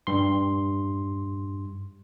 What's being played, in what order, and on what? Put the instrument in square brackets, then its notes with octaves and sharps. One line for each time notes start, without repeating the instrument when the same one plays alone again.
[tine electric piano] G2 C6